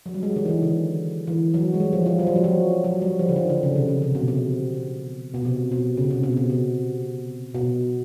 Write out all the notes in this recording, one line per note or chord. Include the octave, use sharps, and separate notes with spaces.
F#3
G3
G#3
D#3
E3
D#3
D3
E3
F#3
G#3
G3
F3
F3
G3
F#3
F3
F#3
F#3
G3
F3
D3
D#3
D3
C#3
C3
C#3
C3
B2
C3
B2
C3
B2
C#3
C3
B2
B2
C3
B2